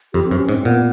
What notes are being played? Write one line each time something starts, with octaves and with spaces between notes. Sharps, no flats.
F2 G4
F#2 C4
C#4
G#2
C4
A#2 B3